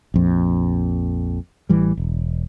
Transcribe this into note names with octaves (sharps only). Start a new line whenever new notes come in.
A#1 F2
A1 E3 G3
E1